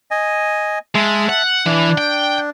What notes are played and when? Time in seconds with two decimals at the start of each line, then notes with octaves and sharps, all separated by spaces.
0.11 D#5 G#5
0.95 G#3 E5 A5
1.29 F#5
1.66 E3 D4
1.98 G5